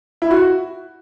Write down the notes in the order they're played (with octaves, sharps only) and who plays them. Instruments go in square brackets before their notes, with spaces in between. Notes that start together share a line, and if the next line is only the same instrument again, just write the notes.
[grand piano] E4
F#4